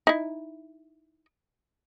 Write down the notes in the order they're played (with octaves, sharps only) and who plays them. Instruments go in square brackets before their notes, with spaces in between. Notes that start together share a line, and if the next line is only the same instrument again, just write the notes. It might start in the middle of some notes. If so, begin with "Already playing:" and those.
[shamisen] D#4 E4